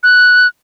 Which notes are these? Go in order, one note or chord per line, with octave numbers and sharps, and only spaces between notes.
F#6